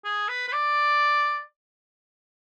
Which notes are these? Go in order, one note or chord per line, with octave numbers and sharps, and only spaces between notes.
G#4
B4
B4
D5